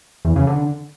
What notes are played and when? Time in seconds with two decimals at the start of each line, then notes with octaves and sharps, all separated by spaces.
0.25 E2
0.36 C#3
0.47 D3